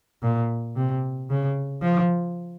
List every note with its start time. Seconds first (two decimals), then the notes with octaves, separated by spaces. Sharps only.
0.23 A#2
0.76 C3
1.30 C#3
1.82 F3